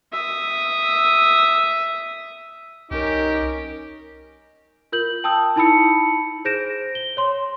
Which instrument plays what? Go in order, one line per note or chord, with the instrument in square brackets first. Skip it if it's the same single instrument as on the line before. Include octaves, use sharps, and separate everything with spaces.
[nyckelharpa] E5 D#6
[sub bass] C2 [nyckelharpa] C#4 A#4 [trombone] D#4 [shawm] G4
[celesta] F4 A#4 G6 F#7
G5 A5 D#6 E6 G6
D#4 E4 A5 B5 E6 C#7
G#4 C5 G6 A#6 D7 E7
G7
C#5 C6